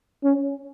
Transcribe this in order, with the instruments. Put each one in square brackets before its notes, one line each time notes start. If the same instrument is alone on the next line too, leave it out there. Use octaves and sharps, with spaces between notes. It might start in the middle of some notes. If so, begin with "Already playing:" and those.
[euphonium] C#4